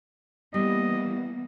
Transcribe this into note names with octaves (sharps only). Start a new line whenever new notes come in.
E3 G3 A#3 B3 D#5